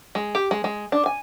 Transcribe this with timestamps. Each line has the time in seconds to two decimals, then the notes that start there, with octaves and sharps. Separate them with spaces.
0.15 G#3
0.35 G4
0.51 G#3
0.64 G#3
0.92 D4
1.06 G#5